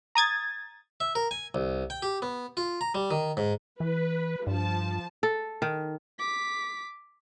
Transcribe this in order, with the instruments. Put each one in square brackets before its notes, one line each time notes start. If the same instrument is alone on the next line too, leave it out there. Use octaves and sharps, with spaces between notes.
[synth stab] A#5 D#6 G#6 A6
[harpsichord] E5
A#4
G#5
C2
G5
G4
B3
F4
A#5
G3
D#3
G#2
[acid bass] E3 [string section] B4
[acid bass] G2 [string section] F3 A5
[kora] A4
D#3
[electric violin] D6 B6